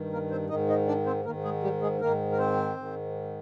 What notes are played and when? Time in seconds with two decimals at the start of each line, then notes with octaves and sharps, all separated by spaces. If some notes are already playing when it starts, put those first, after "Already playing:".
Already playing: G2 D#3
0.12 A#3 A#4
0.31 C4 C5
0.49 G#2 D#3 D#4 D#5
0.68 D#4 D#5
0.87 D4 D5
1.06 C4 C5
1.25 D#3 A#3 A#4
1.30 G#2
1.44 G#3 G#4
1.63 G3 G4
1.81 G#3 G#4
2.01 G#2 D#3 A#3 A#4
2.32 A#4
2.38 C4 C5
2.77 G#2 D#3